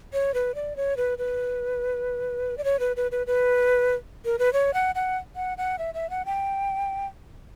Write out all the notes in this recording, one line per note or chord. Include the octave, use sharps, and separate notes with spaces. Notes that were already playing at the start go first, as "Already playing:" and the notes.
C#5
B4
D5
C#5
B4
B4
D5
C#5
B4
B4
B4
B4
A#4
B4
C#5
F#5
F#5
F#5
F#5
E5
E5
F#5
G5